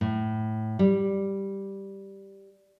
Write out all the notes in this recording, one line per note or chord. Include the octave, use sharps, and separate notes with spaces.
A2
G3